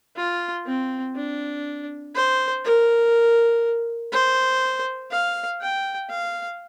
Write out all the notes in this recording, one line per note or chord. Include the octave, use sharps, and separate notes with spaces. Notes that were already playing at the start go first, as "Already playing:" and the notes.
F4
C4
D4
C5
A#4
C5
F5
G5
F5